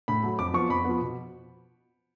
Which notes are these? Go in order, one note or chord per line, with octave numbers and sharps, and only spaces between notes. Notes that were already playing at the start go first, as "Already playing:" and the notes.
A2 B5
F#3 A3
F2 D6
F3 B3 C#6
F2 B5
F3 B3
B2